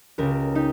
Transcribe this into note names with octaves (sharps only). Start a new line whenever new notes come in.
C#2 C#3 G4 A#4
D#4 G4